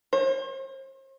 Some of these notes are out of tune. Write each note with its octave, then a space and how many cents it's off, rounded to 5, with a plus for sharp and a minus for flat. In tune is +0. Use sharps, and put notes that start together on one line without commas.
C5 +45